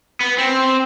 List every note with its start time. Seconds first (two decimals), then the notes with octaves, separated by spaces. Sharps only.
0.21 B3
0.38 C4